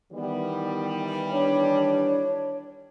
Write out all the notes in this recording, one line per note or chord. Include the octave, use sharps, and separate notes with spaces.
D#3 E3 G3 B3
D4 C#5